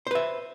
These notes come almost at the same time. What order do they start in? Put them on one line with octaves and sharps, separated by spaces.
C5 B4 E5